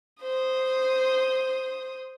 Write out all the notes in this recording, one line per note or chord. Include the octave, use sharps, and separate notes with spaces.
C5 D#6